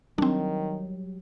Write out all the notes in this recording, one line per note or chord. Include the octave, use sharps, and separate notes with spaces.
D#3 F#3 G3 C4 D4